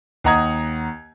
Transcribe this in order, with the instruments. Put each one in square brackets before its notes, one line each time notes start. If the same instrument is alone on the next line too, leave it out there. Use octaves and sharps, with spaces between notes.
[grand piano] D#2 D#5 F#5 A#5 D#6 G#6